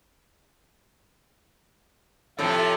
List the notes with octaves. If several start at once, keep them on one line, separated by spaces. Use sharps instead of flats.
A2 C3 F3 A4